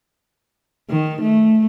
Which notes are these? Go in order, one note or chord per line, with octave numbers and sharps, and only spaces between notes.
D#3
A3